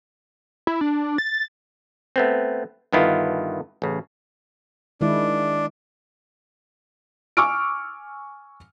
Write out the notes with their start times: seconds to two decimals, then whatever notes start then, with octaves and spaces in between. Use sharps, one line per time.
0.67 E4
0.81 D4
1.18 A6
2.16 A3 B3 C4
2.93 G2 D3 D#3 B3 E4 F4
3.82 A1 C#3
5.01 D#3 G#3 D4 E4
7.37 G#5 C#6 D6 E6 F6 D7